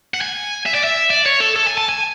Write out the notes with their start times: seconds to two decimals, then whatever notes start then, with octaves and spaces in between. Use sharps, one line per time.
0.14 F#5
0.21 G#5
0.66 E5
0.75 D5
0.84 E5
1.10 D5
1.26 C#5
1.40 A4
1.56 A4
1.67 G#5
1.78 A5
1.89 G#5